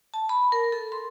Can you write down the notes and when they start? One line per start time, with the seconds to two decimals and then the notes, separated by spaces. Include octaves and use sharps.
0.14 A5
0.29 B5
0.52 A#4
0.72 A4
0.92 C6